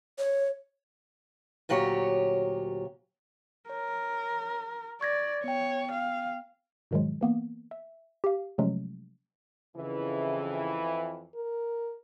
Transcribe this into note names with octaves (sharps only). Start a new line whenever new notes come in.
C#5
D2 A#2 F#3 G4 C#5
A#4 C#5
D5 C#6 G#6 A#6
B3 C#5 G5
F5
G#2 B2 D#3 F3 F#3 G#3
E3 A#3 B3
E5
G4 F5
C3 F3 F#3 G#3 A3 C#4
F2 C#3 E3
A#4